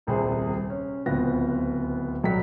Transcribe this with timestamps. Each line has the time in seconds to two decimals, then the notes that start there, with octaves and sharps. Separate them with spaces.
0.07 D#1 C2 C3 G#4 C5
0.70 C#4
1.06 D1 C#2 B3 C4 F4 A#6
2.23 D#1 B1 F#3 G3 G5 B6